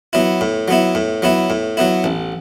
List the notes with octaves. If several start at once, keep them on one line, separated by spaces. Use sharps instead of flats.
F#3 B3 E4
A2
F#3 B3 E4
A2
F#3 B3 E4
A2
F#3 B3 E4
A1